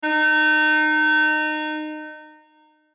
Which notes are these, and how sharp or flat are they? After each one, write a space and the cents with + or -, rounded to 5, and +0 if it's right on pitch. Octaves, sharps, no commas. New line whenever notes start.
D#4 -25